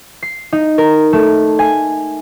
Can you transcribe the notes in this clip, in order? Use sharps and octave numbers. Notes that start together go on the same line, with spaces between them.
C7
D#4
A#4
A3
G#5